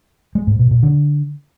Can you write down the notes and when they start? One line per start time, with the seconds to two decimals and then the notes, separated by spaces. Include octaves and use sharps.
0.35 G#3
0.47 G#2
0.59 B2
0.71 A#2
0.83 D3